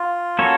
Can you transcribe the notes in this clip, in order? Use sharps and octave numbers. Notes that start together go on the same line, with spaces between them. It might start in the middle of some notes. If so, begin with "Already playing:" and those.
Already playing: F4
A#3 C#4 F#4 A4 C#5